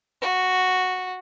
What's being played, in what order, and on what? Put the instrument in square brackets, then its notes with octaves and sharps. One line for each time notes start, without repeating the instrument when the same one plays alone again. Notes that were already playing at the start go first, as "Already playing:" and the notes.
[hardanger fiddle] F#4